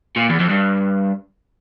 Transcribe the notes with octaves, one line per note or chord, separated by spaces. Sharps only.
A#2
E2
F2
G2